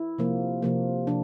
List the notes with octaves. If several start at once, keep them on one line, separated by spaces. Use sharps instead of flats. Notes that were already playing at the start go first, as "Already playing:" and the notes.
Already playing: E4
C3 F3 A#3
C3 F3 A#3
C3 F3 D4